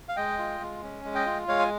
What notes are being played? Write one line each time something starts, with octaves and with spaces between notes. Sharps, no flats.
F5
G#3 D#5 G5
F4
G#3
C#4
G#3
D#5 G5
F4
G#3 C#5 F5
G#5